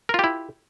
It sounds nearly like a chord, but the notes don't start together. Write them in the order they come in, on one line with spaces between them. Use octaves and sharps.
A#4 F4 G4 E4